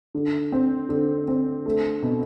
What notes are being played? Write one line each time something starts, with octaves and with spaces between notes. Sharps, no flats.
D3
C4
D3
C4
A3
B2